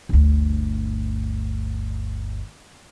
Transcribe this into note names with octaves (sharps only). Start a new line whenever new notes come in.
G1 D2